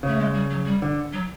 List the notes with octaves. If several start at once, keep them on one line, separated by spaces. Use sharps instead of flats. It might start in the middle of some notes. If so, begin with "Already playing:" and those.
C#3 A3
G#3
G3
F#3
G3
D3
F#3